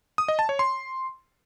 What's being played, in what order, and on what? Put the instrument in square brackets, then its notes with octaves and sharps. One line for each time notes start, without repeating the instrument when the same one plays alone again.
[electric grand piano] D#6
D#5
A5
C#5
C6